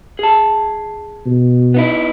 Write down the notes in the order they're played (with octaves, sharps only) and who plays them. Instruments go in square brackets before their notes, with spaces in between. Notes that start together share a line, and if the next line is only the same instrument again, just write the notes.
[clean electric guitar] G#4 A5
[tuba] B2
[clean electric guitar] B3 D#4 E4